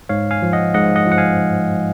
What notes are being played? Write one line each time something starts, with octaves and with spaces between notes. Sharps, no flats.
G#2 C#5 F5
F5 G#5
F3
D#5 F#5
G#2 D#5 F#5
D#5 F#5
F3 F#5
F5 G#5